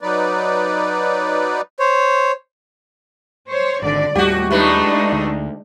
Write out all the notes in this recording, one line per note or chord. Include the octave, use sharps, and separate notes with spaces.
F#3 D#4 B4 D5
C5 C#5
C5 C#5
G#1 D3 D5
D#2 A2 G3 F#4 G4
A2 G#3 A3 D4 D#4 B4
D2